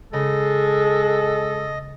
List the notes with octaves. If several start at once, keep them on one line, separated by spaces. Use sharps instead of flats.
C#3 G#3 A4 D#5